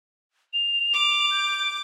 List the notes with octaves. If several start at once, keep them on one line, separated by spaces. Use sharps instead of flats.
F7
D6
G6